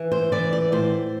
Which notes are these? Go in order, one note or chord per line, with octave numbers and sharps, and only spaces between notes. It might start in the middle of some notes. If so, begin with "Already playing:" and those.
Already playing: E3
C5
E3 D5
D5
A2 C5